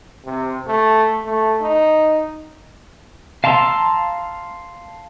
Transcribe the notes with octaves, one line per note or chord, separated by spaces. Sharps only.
C3
A3
A3
D#4
F5 A5 A#5 C6 E6